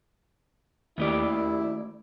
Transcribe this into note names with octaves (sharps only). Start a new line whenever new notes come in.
D#2 D#3 A3 A#3 E4 G4 D5